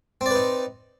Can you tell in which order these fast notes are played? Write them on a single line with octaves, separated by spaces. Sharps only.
C4 D5 B4 D#4